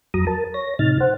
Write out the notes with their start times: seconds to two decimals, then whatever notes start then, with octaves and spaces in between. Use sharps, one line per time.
0.14 F2 F#3 A#5 D#6
0.27 A#4 A5
0.54 C#5 A#6
0.79 A2 C3 D#4 F6 A6
1.00 C5 F#5